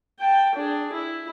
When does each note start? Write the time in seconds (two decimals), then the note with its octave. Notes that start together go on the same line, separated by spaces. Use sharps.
0.19 G5 A5
0.55 D4 G#4
0.92 E4